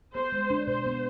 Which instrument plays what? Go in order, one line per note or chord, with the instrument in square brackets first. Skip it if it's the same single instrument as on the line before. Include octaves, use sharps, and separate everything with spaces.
[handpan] B3 [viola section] C5
[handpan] G#3
D4
[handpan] B2 [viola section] C5
[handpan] B3